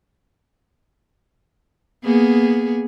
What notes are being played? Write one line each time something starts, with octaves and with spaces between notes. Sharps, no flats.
A#3 B3 G#4